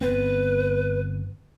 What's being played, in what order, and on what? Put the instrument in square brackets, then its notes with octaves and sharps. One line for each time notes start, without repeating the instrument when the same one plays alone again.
[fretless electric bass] G1 B3 C4 [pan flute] B4